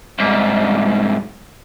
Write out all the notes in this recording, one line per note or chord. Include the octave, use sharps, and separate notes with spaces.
C2 G#2